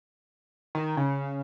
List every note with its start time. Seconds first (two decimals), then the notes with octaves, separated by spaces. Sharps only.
0.75 D#3
0.97 C#3